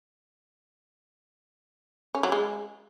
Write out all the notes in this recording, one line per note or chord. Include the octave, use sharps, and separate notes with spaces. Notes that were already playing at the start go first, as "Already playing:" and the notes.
C#4
F#3
G#3